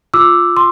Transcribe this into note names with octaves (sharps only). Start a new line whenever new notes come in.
F4 D6 E6
C6